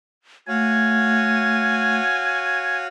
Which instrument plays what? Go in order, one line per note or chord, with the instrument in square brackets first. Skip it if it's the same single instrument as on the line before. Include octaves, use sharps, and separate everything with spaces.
[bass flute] A3 [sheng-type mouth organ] F#4 C#5 F5 [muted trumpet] G#5